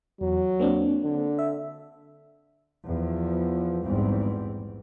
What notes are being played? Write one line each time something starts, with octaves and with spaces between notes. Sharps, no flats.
E2 F#3
A#3 C4 D4
D3
E5
E2 F3
A#1 E2 G#2 G3 C4